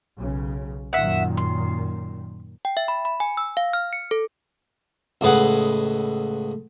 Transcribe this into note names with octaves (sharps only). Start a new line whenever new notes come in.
B1 C#3
F#2 A#2 D#3 E5 F#5
C6
G5
E5
B5
B5
G#5
E6
F5
F6
C#7
A4
C#2 A2 G#4 B4 F#5